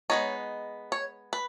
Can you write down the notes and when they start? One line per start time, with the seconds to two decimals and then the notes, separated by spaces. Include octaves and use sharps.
0.10 G#3 B3 D#4 C#5
0.92 C#5
1.33 B4